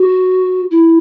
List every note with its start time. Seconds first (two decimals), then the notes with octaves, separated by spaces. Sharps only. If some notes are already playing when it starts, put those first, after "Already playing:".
Already playing: F#4
0.71 E4